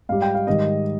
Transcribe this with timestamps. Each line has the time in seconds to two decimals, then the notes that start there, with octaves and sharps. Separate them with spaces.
0.09 G#2 G3 F5
0.22 G5
0.34 F5
0.47 G#2 D#3 G3 D#5